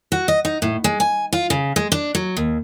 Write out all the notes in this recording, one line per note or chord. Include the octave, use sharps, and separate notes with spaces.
F#4
D#5
D#4
A2
G#3
G#5
F4
C#3
G#3
D4
F#3
D#2